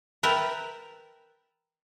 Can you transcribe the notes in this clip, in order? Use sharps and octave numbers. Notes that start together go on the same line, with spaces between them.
A#4 B4 E5 G5 A5 A#5